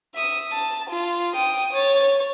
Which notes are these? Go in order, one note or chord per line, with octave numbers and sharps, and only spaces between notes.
E5 D#6
A5
F4
G5 D#6
C#5 A6
C#5